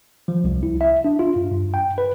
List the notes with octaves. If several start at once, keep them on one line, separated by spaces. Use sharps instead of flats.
F3
C2
E4
E5
D4
F4
G2
G2
G5
B4